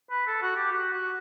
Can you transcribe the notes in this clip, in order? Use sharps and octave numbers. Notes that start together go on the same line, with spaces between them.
B4
A4
F#4
G4
F#4
F#4